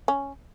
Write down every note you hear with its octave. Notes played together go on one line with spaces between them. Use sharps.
C#4